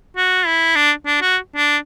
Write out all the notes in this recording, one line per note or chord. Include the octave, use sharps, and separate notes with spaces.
F#4
E4
D4
D4
F#4
D4